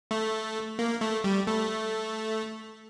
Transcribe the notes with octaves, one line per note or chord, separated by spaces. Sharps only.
A3
A#3
A3
G3
A3